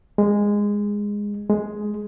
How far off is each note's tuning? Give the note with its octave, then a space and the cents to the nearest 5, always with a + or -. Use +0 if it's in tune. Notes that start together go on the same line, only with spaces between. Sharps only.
G#3 -15
G#3 +5